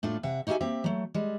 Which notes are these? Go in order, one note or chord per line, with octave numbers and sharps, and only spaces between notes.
A2 A3 D4 F4
C3 E5 F#5
D#4 F#4 G4 B4 E5 G#5
A#3 C4 G4 E5
F#3 A3
G3 G#3